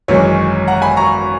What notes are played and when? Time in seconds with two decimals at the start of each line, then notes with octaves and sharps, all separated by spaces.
0.08 G#1 F#2 E3 G#3 C#5
0.68 F#5 A#5
0.82 G#5 B5
0.97 A#5 C#6